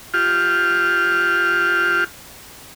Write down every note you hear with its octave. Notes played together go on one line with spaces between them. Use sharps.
F4 G4 F6